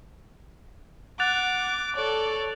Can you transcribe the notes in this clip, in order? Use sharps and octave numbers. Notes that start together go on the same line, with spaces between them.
F#5 D6 F#6 A6 F7
A4 C#5 D5